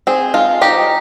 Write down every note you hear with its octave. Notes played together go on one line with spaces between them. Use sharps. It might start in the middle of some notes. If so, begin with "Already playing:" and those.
C4 G#4
G#3 F4
D#4 G4